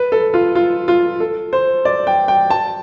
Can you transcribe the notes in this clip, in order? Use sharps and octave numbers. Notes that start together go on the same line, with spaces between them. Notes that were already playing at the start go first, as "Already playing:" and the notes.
Already playing: B4
A4
F4
F4
F4
A4
C5
D5
G5
G5
A5